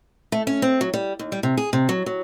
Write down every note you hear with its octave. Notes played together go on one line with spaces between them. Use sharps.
A3
C#4
C4
F#3
G3
D#2
G3
C3
G#4
C3
F#3
F#3